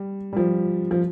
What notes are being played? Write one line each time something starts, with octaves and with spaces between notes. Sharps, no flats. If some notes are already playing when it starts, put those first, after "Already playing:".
Already playing: G3
G3
F3
F3